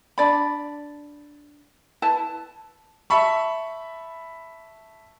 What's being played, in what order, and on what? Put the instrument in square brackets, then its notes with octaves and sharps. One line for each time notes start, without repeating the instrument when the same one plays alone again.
[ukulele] D4 D5 B5
E4 B4 A5
[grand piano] E5 A5 B5 C#6